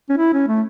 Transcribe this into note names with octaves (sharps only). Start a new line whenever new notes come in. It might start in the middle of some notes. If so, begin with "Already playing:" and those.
C#4
E4
C#4
A3